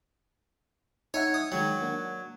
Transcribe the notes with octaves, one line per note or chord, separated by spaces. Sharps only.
D#4 C#5 E5 F#5 G#5
D#6
D#3 F#3 G#3 G5
A#3 D4 F#5